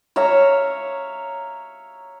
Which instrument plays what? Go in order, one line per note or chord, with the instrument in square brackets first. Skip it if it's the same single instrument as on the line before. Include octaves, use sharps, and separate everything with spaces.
[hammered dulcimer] C#5 E5 F5 A#5